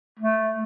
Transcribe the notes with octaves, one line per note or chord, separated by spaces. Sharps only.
A3